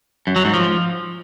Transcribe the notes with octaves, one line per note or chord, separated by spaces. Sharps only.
F#2
F#3
G#2
F3